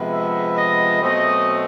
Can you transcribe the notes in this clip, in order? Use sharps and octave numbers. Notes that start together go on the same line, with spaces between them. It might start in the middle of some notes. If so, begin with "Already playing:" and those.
Already playing: C3 F3 G#3 B3
E5
D#5
B2 F#3 A3 C4 D#5